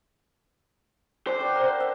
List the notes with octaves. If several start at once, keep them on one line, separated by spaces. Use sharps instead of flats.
D4 G4 A4 C5
D5 F#5
A#4
E5 F#5